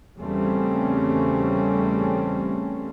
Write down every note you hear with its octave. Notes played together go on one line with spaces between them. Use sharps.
E2 C#3 G3 A3 C4 C#4